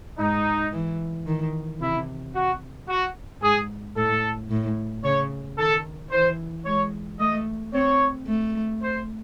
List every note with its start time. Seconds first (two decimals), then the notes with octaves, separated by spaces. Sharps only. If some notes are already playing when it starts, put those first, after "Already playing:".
0.18 G#2 D#4
0.72 E3
1.26 D#3
1.80 C3 E4
2.34 F#4
2.88 F#4
3.42 G#2 G#4
3.96 A2 A4
4.50 A2
5.04 C#3 C#5
5.58 D#3 A4
6.11 E3 C5
6.65 G#3 C#5
7.19 A3 D#5
7.73 C4 C#5
8.27 A3
8.82 C5